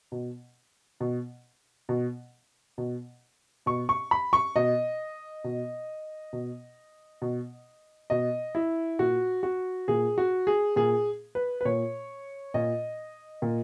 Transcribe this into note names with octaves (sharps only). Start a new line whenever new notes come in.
B2
B2
B2
B2
B2 C#6
C#6
B5
C#6
B2 D#5
B2
B2
B2
B2 D#5
E4
A#2 F#4
F#4
A#2 G#4
F#4
G#4
A#2 G#4
B4
B4
A#2 C#5
A#2 D#5
A#2